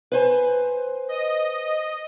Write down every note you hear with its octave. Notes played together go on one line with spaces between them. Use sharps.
B4 C5 G#5
D#5